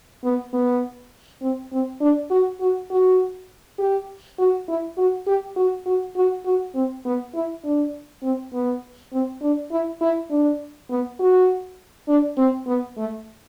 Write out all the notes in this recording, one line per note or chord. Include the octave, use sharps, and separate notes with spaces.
B3
B3
C4
C4
D4
F#4
F#4
F#4
G4
F#4
E4
F#4
G4
F#4
F#4
F#4
F#4
C4
B3
E4
D4
C4
B3
C4
D4
E4
E4
D4
B3
F#4
D4
C4
B3
A3